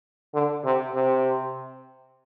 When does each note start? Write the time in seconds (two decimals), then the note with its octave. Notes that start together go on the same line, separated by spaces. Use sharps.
0.34 D3
0.65 C3
0.95 C3